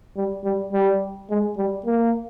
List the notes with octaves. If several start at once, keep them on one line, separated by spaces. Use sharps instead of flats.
G3
G3
G3
G#3
G3
A#3